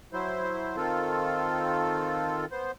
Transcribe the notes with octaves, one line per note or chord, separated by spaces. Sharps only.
F#3 E4 C5
D#3 C4 F4 A4
B3 C5